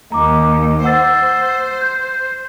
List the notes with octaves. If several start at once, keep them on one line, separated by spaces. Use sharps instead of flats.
D#2 A#5 D6
C5 F#5 E6 A6
G6